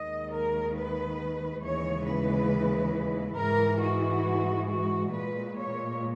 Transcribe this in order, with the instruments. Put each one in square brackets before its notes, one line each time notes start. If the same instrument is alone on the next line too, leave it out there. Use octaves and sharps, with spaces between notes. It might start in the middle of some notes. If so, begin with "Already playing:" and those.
Already playing: [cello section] D#2 D#3 G#3 D#5
A#4
B4
D#2 C#3 E3 G#3 C#5
B4
G#2 E3 G#3 A#4
F#4
F#4
A#2 G#3 B4
C#5